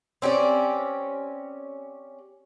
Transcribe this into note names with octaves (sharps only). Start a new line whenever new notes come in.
C4 C#4 G4 D5